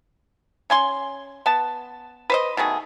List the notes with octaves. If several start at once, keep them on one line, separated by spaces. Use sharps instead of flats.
C#4 G#5 C6
B3 A5
B4 C5 D#5
B2 D#3 A3 G#4